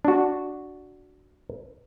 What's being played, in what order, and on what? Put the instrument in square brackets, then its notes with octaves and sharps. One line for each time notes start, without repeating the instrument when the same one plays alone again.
[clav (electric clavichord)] D4 F#4